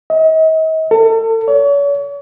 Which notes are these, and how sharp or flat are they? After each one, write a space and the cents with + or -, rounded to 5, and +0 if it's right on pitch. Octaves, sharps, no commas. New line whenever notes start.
D#5 +40
A4 +35
C#5 +40